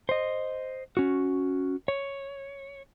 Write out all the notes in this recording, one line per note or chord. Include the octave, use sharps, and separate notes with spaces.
C5 D#5
C#4 F#4
C#5